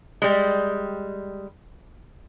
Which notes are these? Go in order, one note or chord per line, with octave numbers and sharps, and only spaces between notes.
G3 G#3